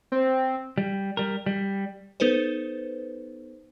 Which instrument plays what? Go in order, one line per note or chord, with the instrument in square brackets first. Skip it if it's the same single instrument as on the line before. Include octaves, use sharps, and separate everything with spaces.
[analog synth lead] C4
[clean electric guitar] G3
G3 A#4
G3
[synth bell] B3 D#4 A4 B4 C5